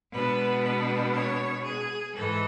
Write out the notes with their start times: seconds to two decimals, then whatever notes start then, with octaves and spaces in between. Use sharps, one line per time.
0.12 B2 G#3 B3 D4 B4
0.62 B4
1.13 C#5
1.63 G#4
2.13 G#2 E3 G#3 A4